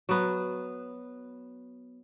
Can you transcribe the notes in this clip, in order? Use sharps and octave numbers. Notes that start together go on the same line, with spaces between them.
F#3 B3